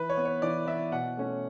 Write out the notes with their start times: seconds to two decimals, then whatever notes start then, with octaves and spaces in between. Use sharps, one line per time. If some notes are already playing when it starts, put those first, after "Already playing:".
Already playing: E3 B4
0.10 C#5
0.18 B3
0.25 C#5
0.42 E3 D5
0.67 B3 E5
0.92 B2 F#5
1.17 A3 C#4